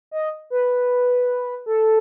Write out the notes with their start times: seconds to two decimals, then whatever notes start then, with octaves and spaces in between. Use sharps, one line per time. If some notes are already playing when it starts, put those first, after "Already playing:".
0.11 D#5
0.50 B4
1.66 A4